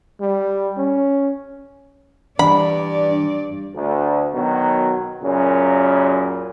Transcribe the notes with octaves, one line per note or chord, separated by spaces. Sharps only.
G3
C#4
G2 E3 D4 D5 B5
D2
B2 D#3 F#3
F#2 A#2 C#3